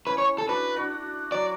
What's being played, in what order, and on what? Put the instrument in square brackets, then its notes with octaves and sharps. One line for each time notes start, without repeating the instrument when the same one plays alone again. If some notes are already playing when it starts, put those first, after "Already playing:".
[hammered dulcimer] C#4 E4 [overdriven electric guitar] B4
[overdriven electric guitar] C#5
A4
[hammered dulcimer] D4 F#4 [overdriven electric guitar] B4
[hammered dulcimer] D4 F#4
[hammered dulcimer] F#3 [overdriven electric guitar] D5